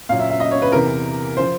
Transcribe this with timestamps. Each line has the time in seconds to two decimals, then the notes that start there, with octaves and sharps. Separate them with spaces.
0.09 A#2 F#3 F5
0.19 E5
0.30 E5
0.40 D#5
0.51 C#5
0.62 B4
0.72 E2 C3 E3 A#4
1.37 F3 C5